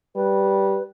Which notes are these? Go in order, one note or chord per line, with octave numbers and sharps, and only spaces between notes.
G3 B4